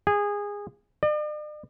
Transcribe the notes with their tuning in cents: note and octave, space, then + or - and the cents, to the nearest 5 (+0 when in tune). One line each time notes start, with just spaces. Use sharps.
G#4 -20
D5 +45